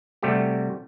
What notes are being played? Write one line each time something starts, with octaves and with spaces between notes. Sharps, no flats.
C3 G3 A3 F#4 G4